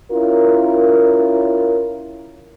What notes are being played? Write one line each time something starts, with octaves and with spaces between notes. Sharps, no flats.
C#4 E4 F4 A#4